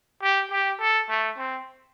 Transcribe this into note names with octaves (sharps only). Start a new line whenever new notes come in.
G4
G4
A4
A3
C4